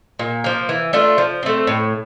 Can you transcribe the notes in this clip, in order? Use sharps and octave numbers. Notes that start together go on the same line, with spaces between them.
A#2
F3 A#3
E3
A3 D4 F4
F3
A3 C4
A2